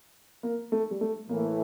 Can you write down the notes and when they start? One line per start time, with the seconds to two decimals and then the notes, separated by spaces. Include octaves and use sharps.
0.43 A#3
0.72 A3
0.91 G3
1.01 A3
1.29 A2 E3 A3 A#3